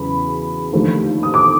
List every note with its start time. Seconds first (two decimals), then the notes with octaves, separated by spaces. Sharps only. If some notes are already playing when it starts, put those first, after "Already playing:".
Already playing: E2 C#3 F#3 B5
0.72 D#2 D3 F3 A3
1.23 D#6
1.34 D6